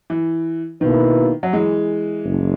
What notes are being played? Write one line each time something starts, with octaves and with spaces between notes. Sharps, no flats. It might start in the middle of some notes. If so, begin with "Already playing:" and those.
E3
B2 D#3 A#3 E4 B4
F#3
E3 G#3
F#1